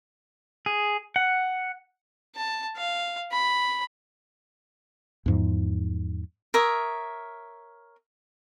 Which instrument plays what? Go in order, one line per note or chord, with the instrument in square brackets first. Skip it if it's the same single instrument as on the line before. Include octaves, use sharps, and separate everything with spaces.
[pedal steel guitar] G#4
F#5
[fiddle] A5
F5
B5
[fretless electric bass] E2 G#2 F3
[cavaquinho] A#4 C#5 E5 D#6